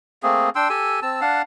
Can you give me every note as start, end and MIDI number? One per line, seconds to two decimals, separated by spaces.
0.23 0.50 57
0.23 0.50 58
0.23 0.50 60
0.23 0.50 68
0.55 0.69 62
0.55 0.69 79
0.55 0.69 84
0.55 0.69 88
0.69 1.00 67
0.69 1.00 69
0.69 1.00 80
0.69 1.00 88
1.02 1.21 60
1.02 1.21 81
1.02 1.21 88
1.21 1.42 62
1.21 1.42 77
1.21 1.42 78
1.21 1.42 81